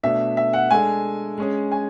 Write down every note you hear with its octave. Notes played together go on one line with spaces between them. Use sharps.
B2 A3 D4 E5
E5
F#5
G#3 D4 A4 G#5
G#3 C#4 G#4
G#5